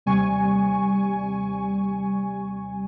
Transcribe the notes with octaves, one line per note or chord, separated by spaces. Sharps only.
D#2 C3 G3 G#5 C#6